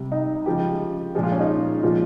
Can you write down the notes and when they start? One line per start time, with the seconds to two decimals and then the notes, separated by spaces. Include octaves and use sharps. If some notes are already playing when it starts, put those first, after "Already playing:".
Already playing: C3 G3
0.12 D#4
0.46 C#3 F3 G#3 G4
1.15 A#2 F3 G#3 G#4
1.23 F4
1.32 C#4
1.40 D#4
1.83 A#2 F3 G#3 F4